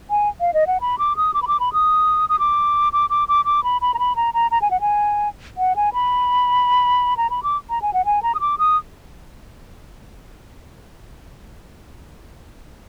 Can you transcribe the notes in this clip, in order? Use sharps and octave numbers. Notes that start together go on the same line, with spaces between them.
G#5
F5
D#5
F#5
B5
D6
D#6
D6
B5
D6
B5
D#6
D#6
D6
D6
D6
D6
D6
B5
B5
A#5
B5
A#5
A#5
A#5
G#5
F#5
G#5
F#5
G#5
B5
A#5
B5
D6
A#5
G#5
F#5
G#5
A#5
D#6
D6
D#6